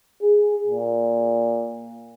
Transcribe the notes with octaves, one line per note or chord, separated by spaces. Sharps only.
G#4
A#2